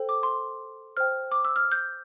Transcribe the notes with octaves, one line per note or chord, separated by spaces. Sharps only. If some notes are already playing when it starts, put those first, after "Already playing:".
Already playing: A4 C5 G5
D6
C6
C5 G5 F6
D6
E6
F6
G6